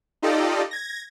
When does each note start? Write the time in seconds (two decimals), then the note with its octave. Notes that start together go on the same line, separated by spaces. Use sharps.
0.22 D#4 F4 G4 A4 D5 D#5
0.71 G#6 A#6